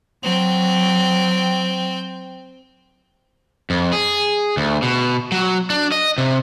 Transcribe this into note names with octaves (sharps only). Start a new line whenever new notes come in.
F#3 C4 G5
F2
G#4
D2
B2
F#3
D4
D#5
C3